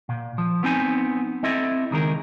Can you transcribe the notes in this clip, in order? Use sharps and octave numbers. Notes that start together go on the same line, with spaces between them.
A#2
F3
B3 C4 D#4 G#5
C4 E4 A4 D#5 E5
C#2 D#3 G#4 A#4